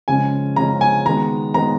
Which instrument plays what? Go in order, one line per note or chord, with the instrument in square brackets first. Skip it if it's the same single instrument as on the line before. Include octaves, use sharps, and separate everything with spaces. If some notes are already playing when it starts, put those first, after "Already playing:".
[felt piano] C#3 F3 G#3 C#4 [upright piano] G#5
[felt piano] C#3 F3 G#3 C#4 [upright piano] A#5
[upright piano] G#5
[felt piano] D#3 G#3 B3 F#4 [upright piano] A#5
[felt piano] D#3 G#3 B3 F#4 [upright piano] A#5